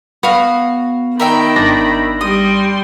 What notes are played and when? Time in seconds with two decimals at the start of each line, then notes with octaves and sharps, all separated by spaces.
0.23 B3 F#4 F5
1.20 D#3 A#4 E5 G5 B5
1.56 G#1 D4 A#6
2.21 G3 C6 D#6